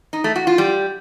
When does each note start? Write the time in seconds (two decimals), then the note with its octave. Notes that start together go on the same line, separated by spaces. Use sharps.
0.13 D#4
0.24 A3
0.36 F#4
0.47 F4
0.58 G3